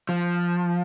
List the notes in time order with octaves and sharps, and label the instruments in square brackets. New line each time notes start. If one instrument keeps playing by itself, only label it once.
[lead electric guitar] F3